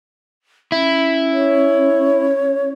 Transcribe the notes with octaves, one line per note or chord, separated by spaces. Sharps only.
C#4 E4
C#5